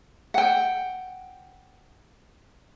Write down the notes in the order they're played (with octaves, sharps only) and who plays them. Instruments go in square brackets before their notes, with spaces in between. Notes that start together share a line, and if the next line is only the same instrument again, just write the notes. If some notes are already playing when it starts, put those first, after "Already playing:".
[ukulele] F#5 G5